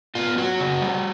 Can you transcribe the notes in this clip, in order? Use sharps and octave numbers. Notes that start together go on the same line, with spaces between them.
B3 F4
F#3 F#4
C#3
G3